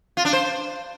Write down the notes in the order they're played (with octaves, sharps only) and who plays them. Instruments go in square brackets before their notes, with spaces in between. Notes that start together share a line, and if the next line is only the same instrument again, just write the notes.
[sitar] F4
D4
C5